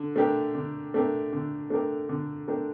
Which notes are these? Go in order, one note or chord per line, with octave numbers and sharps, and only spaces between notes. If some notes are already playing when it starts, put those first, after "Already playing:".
Already playing: D3
A3 D4 G4 A#4
D3
A3 D4 G4 A#4
D3
A3 D4 G4 A#4
D3
A3 D4 G4 A#4